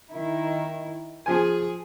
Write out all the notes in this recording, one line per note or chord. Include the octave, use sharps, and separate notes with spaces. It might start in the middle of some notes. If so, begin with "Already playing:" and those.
D#3 E4
F3 G#4 G#5